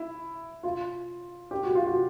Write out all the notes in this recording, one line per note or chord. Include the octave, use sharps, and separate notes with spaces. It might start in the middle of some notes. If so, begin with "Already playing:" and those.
Already playing: E4
F4
G4
F#4
F4
F#4